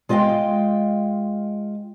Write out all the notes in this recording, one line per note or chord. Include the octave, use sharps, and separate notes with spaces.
G#3 F4 D#5 F5 G5